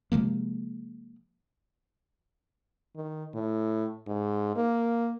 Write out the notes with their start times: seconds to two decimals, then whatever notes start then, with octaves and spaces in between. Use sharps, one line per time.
0.12 C3 F3 G#3 A#3
2.95 D#3
3.34 A2
4.07 G#2
4.56 A#3